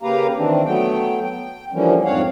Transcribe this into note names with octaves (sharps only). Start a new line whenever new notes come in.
C#3 A#3 G4 B4 F5 A#5
D#3 E3 C4 D4
F#3 A3 B3 G5
G5
D3 E3 F3 G3 A#3 C#4
F2 G#2 C4 C#5 F5 F#5